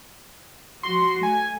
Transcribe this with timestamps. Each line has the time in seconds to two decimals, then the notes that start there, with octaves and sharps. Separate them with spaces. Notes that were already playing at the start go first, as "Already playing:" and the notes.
0.83 F3 F#4 C6
1.23 A3 G#5